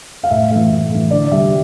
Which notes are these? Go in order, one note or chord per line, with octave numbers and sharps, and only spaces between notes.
F5
A2 E5
E3 A3 E5
A2
E3 A3
D3 D5
G3 E5